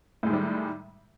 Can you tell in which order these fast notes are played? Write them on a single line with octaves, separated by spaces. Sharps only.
A2 G#3 D#3 G3